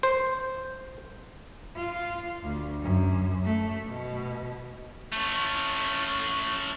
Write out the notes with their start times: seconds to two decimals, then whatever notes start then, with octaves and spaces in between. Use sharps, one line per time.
0.03 C5
1.77 F4
2.43 D2
2.82 F#2
3.44 A3
3.88 B2
5.12 A3 C#4